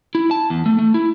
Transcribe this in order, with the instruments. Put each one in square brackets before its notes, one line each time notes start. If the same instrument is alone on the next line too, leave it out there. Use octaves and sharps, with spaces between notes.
[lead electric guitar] E4
A5
E2
A3
A3
E4